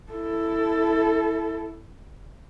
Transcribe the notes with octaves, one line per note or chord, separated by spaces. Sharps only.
E4 A4